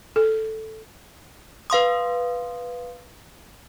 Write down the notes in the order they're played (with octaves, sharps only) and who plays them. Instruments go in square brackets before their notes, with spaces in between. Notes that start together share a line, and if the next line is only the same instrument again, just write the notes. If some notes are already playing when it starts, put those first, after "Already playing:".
[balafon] A4
[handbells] B4 F5 C6 D#6